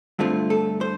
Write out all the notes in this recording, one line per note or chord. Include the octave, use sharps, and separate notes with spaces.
G2 D3 A3 C4 F4
A4
C5